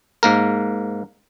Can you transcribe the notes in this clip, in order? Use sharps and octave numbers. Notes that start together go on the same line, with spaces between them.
G#2 A#3 A#4